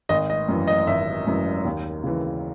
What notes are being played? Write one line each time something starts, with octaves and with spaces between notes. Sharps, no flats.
G#1 D#5
D#5
F#2 E3
D#5
G#1 E5
F#2 E3
D#2
C#3 E3